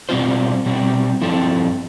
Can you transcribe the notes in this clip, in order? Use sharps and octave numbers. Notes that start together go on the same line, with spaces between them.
B2 G3 C4 F4 C5
B2 G3 C4
G2 F3 C4 E4 A4